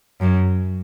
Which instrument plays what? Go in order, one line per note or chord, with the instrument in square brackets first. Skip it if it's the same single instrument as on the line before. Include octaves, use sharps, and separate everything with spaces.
[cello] F#2